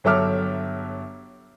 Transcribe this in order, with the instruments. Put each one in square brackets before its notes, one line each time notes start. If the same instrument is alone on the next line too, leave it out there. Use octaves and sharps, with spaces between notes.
[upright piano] G1 F#3 A4 E5 D6 F6